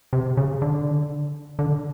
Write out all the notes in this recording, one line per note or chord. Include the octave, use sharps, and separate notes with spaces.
C3
C#3
D3
D3